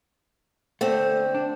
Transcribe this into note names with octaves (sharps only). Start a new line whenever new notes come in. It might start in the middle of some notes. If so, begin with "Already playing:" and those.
D3 A3 C4
D4